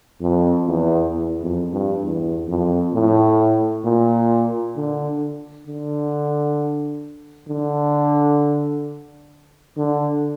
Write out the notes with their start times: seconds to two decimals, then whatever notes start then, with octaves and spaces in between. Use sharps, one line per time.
0.21 F2
0.66 E2
1.12 E2
1.42 F2
1.73 G2
2.03 E2
2.48 F2
2.93 A2
3.84 A#2
4.76 D3
5.67 D3
7.49 D3
9.77 D3